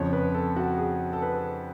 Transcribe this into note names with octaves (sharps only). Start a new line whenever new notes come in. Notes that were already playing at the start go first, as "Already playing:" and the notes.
Already playing: F2 C#3 F3 C#5
B4
A4
F#4
G#4
A4
B4